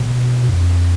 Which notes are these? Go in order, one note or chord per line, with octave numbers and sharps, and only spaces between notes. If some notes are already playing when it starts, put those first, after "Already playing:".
Already playing: B2
F2